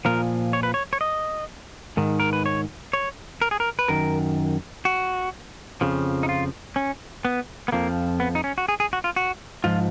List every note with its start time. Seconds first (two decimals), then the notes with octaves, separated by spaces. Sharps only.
0.05 A#2 F3 A#4
0.53 C#5
0.63 B4
0.74 C#5
0.93 C#5
1.01 D#5
1.97 G#2 D#3
2.20 A#4
2.33 B4
2.46 C#5
2.93 C#5
3.42 A#4
3.51 G#4
3.60 A#4
3.79 B4
3.88 F#2 D#3 A#4
4.85 F#4
5.81 F2 C#3 F3
6.23 D#4
6.29 F4
6.76 C#4
7.25 B3
7.68 B3
7.72 F2 F3 A#3
8.20 B3
8.35 D#4
8.44 C#4
8.58 F#4
8.68 G#4
8.80 G#4
8.93 F#4
9.04 F4
9.16 F#4
9.64 G#2 F3 F4